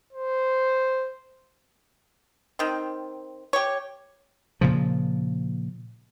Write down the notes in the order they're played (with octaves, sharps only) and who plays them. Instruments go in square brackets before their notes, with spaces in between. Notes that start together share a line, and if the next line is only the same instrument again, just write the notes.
[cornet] C5
[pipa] D#3 C4
G4 C#5
[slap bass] A#2 C#3 F3